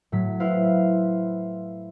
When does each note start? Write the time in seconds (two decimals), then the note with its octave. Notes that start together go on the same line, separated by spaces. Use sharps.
0.12 A2 F#3 B6
0.40 E4 B4 C5 F5